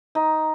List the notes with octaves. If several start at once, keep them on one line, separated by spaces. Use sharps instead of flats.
D#4